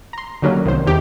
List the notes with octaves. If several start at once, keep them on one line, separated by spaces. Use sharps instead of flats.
A#5 C6
D3 D#3 F#3 G3 A#3 C#4
C2 D#3 C5
E2 D#3 G4